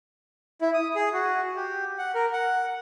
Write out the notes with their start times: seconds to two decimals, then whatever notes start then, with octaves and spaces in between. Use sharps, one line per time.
0.61 E4
0.74 D#6
0.95 G#4
1.13 F#4
1.56 G4
1.98 F#5
2.15 A#4
2.33 F#5